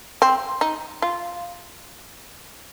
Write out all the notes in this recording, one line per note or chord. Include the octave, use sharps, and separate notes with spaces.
C4
D#4
F4